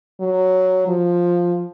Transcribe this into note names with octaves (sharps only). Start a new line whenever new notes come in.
F#3
F3